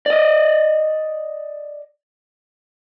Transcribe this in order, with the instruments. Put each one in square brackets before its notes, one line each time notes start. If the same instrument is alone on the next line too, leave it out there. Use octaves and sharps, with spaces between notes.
[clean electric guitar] D5 D#5